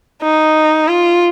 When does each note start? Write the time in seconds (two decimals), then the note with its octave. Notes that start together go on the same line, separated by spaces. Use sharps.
0.23 D#4
0.88 F4